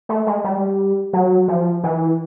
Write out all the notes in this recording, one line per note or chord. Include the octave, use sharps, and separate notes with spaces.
A3
G#3
G3
F#3
F3
E3